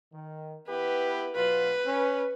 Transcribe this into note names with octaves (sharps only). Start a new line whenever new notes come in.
D#3
B3 E4 G4 B4
B2 F#3 F4 B4
C#4